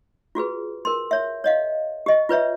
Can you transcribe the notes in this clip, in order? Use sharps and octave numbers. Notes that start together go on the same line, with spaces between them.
F4 F#4 G#4 B4
A#4 C6
C#5 E5
C#5 D#5 F5
G4 D#5
F4 B4 C#5 E5